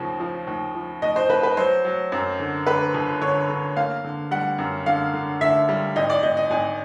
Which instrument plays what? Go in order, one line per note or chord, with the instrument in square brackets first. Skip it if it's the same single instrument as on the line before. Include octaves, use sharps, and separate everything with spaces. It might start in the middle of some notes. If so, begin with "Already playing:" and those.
Already playing: [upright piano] D#2 C#3 F3
F3
D#2
F3
D#2 D#5
C5
D#2 B4
B4
F#3 C5
F#3
F#2
D3
D3 B4
G1
D3 C#5
D3
A#3 F5
D3
G3 F#5
F#2
D3 F5
D3
D3 E5
G3
G#1 D#5
D5
G#1 D#5
D#5
G#1 G#5